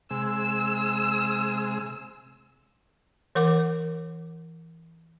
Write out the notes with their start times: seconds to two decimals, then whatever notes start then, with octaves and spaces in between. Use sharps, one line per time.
0.11 C3 G#3 E6
3.35 E3 A#4 F#5 D6